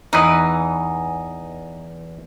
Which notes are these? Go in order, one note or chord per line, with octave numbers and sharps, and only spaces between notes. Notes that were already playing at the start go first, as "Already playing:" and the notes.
E2 E3 D#4 B4 D#5